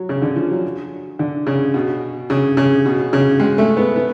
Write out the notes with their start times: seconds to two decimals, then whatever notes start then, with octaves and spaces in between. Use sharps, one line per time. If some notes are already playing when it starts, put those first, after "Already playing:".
Already playing: F#3
0.09 C#3
0.22 D3
0.36 F3
0.50 F#3
1.19 D3
1.47 C#3
1.74 B2
2.30 C#3
2.57 C#3
2.86 B2
3.13 C#3
3.40 G#3
3.58 A3
3.77 B3
3.96 B3